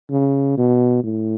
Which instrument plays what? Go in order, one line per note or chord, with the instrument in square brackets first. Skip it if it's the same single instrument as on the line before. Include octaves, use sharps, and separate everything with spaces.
[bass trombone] C#3
B2
A2